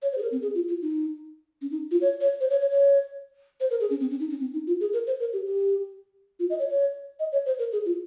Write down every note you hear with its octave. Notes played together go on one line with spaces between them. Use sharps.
C#5
C5
G#4
A#4
C4
G#4
F4
F4
D#4
C#4
D#4
F4
C#5
C#5
C5
C#5
C#5
C#5
C5
A#4
G#4
C#4
C4
C#4
D#4
C#4
C4
D#4
F4
G#4
A#4
C5
A#4
G4
G4
F4
D#5
C#5
C#5
D#5
C#5
C5
A#4
G#4
F4